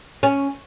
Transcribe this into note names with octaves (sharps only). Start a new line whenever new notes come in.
C#4